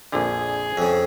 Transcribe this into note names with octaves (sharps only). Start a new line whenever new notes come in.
A#1 F2 D3 G#4
F2 C#3